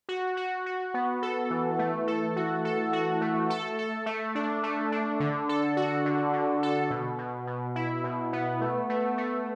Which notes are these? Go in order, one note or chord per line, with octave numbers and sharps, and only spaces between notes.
F#4
F#4
F#4
B3
A4
E3
A3
A4
F#4
A4
F#4
A3
A4
A4
A3
D4
A3
D4
D3
A4
F#4
D3
D3
A4
B2
B2
B2
E4
B2
B3
A3
A3
A3